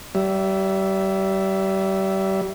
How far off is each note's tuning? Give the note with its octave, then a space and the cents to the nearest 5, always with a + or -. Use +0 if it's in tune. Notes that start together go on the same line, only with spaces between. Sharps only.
G3 -30 E5 +10